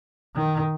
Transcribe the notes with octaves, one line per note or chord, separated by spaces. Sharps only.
D#3